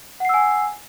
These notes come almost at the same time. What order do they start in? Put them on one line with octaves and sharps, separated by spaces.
F#5 C7 E6 G#5